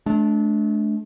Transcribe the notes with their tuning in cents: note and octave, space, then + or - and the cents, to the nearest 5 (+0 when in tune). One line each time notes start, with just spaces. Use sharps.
A3 -40 D4 -10